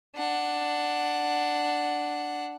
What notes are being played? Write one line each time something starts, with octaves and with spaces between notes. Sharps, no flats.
D4 F#5